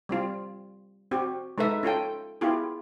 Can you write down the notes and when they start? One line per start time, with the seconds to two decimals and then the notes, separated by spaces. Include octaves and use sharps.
0.09 G3 C4 F4
1.11 C4 F#4 G4
1.58 G#3 D#4 A4 B4 E5
1.83 C#4 F4 A4 G5
2.41 B3 E4 F4 G4 G#4